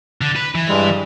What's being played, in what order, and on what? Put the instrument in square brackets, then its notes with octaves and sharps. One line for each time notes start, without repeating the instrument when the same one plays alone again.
[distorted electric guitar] D3
B4
E3
[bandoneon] G2 G3 G#3